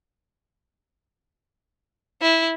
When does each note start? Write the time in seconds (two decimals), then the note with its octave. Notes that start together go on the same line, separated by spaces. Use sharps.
2.22 E4